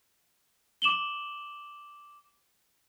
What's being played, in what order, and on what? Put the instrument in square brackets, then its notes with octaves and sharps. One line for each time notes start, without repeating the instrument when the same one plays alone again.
[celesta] D6 E7 F#7 G7